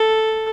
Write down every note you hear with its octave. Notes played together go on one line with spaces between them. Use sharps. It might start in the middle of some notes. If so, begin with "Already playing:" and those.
Already playing: A4